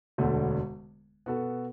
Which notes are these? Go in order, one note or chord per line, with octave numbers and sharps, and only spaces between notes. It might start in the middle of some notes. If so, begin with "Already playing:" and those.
E1 D2 D3 A3
B2 B3 F#4 A4